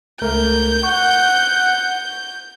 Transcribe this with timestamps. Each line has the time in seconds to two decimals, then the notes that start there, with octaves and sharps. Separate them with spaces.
0.21 C#2 A3 A#4 G6
0.83 F#5 C#6